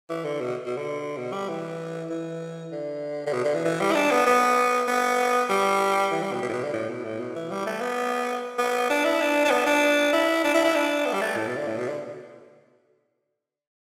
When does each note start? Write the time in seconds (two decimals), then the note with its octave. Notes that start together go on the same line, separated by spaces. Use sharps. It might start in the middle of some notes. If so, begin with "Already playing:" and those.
0.09 E3
0.24 D3
0.41 B2
0.66 B2
0.77 D3
1.17 B2
1.33 G3
1.49 E3
2.10 E3
2.72 D3
3.26 D3
3.33 B2
3.44 D3
3.54 E3
3.64 E3
3.80 G3
3.91 E4
3.95 D4
4.11 B3
4.26 B3
4.88 B3
5.50 G3
6.11 E3
6.22 G3
6.32 B2
6.42 B2
6.49 A2
6.53 B2
6.63 D3
6.73 A2
6.89 B2
7.04 A2
7.19 B2
7.35 E3
7.51 G3
7.66 A3
7.81 B3
8.58 B3
8.90 D4
9.05 E4
9.21 D4
9.45 D4
9.51 B3
9.66 D4
10.13 E4
10.44 D4
10.54 E4
10.64 E4
10.75 D4
11.06 B3
11.13 G3
11.21 A3
11.37 A2
11.47 B2
11.57 D3
11.67 A2
11.78 B2
11.88 D3